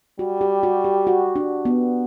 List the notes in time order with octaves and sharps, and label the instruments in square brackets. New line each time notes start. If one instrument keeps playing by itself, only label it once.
[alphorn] G3 [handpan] F#4
[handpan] G4
F#4
G4
F#4
D4
B3